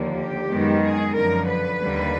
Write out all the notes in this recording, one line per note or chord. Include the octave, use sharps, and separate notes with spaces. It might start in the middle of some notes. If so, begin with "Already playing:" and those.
Already playing: D#2 D3 F3 A#3
G4
F#2 D#3 G#3 B3
G#4
F#2 D3 F3 A#4
B4
D#2 D3 G3 A#3